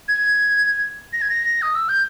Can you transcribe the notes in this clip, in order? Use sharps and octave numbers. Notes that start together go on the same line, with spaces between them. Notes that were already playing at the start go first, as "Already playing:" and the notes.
G#6
A#6
G#6
A#6
D#6
E6
G6